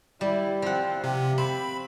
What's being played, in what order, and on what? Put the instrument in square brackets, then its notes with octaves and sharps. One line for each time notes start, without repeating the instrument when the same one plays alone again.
[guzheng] G3 [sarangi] E4
[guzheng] F3 F#5 [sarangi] C4
[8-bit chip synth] C3 [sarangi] G4
[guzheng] C4 [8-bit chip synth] B5